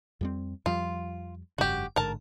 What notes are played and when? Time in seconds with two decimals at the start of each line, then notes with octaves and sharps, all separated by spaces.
0.21 F2 G3 C4
0.66 F2 F3 G3 F4
1.58 F1 G2 C#3 F#4 G4
1.96 A1 G#2 D3 A#4 A5